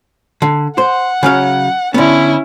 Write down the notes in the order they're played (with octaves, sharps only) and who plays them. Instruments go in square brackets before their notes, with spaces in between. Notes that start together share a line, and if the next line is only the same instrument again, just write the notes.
[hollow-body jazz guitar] D3
[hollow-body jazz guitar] C5 [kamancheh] F#5
[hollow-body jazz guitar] C#3 F#3 F5
[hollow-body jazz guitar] D3 B3 [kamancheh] C#4 E4